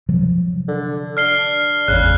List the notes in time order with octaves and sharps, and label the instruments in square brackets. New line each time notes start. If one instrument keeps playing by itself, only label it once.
[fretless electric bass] C3 F3 F#3
[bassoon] D3
[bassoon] D4 [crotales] F6 C7 G7
[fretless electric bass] G#1 E2 [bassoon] C#3 [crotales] F#6